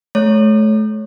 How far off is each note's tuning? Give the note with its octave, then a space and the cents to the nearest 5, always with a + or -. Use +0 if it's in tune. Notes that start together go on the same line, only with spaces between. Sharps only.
A3 -35 C#5 +0